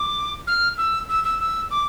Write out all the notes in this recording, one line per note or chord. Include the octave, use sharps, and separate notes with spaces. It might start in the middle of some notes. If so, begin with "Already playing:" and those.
Already playing: D6
F6
E6
E6
E6
E6
D6